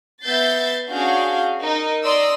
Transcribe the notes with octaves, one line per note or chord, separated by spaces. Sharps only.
B3 E5 G6 A6 C7
C#4 D4 F#4 G#4 F5 G6
D#4 A#4
D5 A#5 C6 D#6 E6